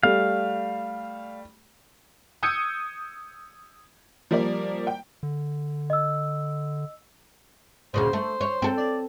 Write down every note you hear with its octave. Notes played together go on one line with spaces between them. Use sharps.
G3 A3 F5
D#6 E6 G6 G#6 C#7 D#7
F3 G3 A#3 D5
G5
D3
D#5 E6
D2 A#2 C#3 C5
A3
C#5
C4 A4
D5